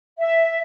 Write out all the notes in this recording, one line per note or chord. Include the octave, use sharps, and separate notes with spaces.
E5